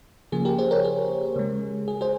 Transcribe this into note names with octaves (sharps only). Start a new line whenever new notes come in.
C#3 F3 A#3 G#4
G4 A#4
G#4 C5
A#4 C#5
G#4
C#3 G#3
G#4
G#4 C5